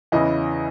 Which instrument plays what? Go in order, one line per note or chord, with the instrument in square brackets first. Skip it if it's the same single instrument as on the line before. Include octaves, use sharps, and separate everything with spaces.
[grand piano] E2 C#3 E3 D#5